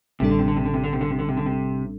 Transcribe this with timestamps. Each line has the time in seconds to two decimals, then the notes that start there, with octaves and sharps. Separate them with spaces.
0.20 A1 A2 C3 G3 D4 A4
0.30 D3
0.39 C3
0.48 D3
0.57 C3
0.65 D3
0.74 C3
0.84 D3
0.93 C3
1.01 D3
1.11 C3
1.19 D3
1.29 C3
1.37 D3
1.46 C3